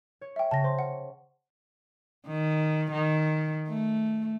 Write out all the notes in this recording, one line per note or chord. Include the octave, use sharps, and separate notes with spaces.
C#5
E5 G5
C#3 A5 A#6
C5 C6
F#5
D#3
D#3
A3